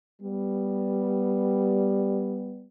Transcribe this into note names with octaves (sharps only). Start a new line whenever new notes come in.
G3 B3